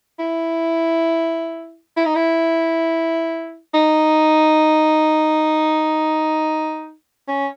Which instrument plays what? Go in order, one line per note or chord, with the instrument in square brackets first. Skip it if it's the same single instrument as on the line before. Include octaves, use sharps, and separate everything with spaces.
[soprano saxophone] E4
E4
D#4
E4
D#4
C#4